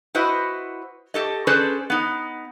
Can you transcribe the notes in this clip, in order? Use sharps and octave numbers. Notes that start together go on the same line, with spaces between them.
E4 F#4 B4 C5 D#5
G4 A4 D#5
C#4 G#4 A4 B4 C5 D5
B3 D#4